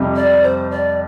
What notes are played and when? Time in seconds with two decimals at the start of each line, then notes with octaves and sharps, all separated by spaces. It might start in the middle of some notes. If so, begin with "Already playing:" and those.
Already playing: F2 C3 G3
0.16 D5
0.43 C5
0.71 D5